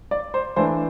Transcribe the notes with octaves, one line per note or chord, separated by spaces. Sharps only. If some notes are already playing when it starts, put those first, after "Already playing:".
D5
C5
E3 A3 D4 C5